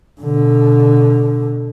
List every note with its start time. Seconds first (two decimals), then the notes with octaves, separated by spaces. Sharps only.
0.22 B2 D3